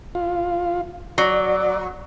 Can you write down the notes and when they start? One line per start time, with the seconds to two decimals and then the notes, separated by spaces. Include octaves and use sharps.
0.15 F4
1.18 F#3 D5